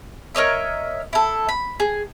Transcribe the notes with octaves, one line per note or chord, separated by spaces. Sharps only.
A#4 C#5 D#5 E5
E4 A4
B5
G#4